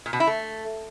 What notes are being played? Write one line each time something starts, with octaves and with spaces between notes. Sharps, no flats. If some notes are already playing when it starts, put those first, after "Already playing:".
A#2
B2
E4
A3